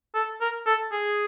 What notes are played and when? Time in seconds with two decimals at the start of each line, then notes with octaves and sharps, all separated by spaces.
0.14 A4
0.41 A#4
0.66 A4
0.92 G#4